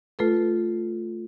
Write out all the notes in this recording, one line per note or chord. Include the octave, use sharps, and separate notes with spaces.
A3 F4 A4 B4